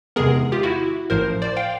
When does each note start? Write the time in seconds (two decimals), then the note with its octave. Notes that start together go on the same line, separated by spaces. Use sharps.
0.16 E2 C3 D#3 G#3 B3 G#4 A#4
0.52 F4 G4
0.63 E4 F#4
1.10 A1 A2 F3 A#4 C5
1.42 C5 D5
1.56 F5 G5